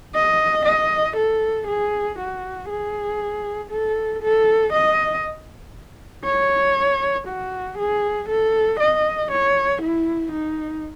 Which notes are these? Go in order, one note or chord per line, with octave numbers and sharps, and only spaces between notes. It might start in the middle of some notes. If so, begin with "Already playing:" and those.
D#5
D#5
A4
G#4
F#4
G#4
A4
A4
D#5
C#5
F#4
G#4
A4
D#5
C#5
E4
D#4